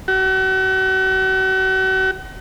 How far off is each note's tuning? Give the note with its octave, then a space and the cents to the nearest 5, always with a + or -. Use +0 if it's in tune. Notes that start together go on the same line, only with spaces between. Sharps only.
F#4 +40